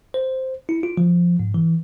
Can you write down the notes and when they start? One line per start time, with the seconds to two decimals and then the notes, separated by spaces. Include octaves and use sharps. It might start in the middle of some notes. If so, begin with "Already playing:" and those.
0.14 C5
0.69 E4
0.83 F4
0.97 F3
1.40 G#2
1.54 E3